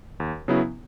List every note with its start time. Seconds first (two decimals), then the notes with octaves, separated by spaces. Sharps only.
0.20 D#2
0.48 C#3 F#3 B3 E4